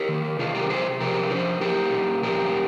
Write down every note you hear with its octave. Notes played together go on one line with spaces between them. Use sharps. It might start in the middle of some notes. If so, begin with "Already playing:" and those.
Already playing: G4 A#4
D#3
C3 F4 G#4
G4 A#4
C3 G#4 C5
F3 G4 A#4
F3 G#4 C5
A#2 G4 A#4
A#2
F3 G4 A#4